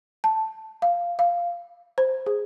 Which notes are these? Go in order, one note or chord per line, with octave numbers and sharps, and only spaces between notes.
A5
F5
F5
C5
G#4